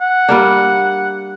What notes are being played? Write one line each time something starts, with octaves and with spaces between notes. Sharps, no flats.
F#5
G3 A#3 D4